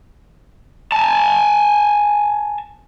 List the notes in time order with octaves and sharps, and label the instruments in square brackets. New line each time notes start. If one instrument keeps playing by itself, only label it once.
[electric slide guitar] G#5 A5